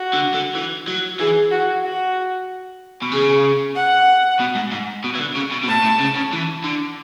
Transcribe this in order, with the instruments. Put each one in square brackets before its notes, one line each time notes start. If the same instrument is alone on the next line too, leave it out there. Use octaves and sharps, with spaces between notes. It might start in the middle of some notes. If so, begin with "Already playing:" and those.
Already playing: [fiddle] F#4
[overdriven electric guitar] D3
D3
E3
F#3
[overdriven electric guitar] E3 [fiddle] G#4
[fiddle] F#4
F#4
[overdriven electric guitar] B2
[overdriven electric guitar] C#3 [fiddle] G#4
[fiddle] F#5
[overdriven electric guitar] B2
G#2
G#2
B2
E3
D3
C#3
B2
B2
[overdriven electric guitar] A2 [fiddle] A5
[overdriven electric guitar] A2
C#3
C#3
E3
D3